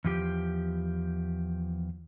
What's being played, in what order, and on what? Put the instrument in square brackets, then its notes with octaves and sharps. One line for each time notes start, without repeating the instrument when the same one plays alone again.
[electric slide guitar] E2 F3 G4